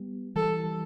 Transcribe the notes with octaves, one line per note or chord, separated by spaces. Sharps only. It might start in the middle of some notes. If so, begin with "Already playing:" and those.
Already playing: G3 B3
E3 G3 A4